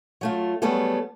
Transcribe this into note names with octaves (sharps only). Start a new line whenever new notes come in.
F#3 A3 F4
F#3 G3 A3 B3 G#4 A4